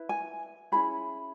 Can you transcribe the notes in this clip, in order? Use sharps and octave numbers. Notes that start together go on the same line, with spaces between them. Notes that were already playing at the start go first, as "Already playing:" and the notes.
Already playing: E4 B4
G#5
C#4 E4 G#4 B5